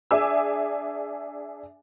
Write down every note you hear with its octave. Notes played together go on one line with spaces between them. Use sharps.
D4 G#4 E5 G#5 D6 E6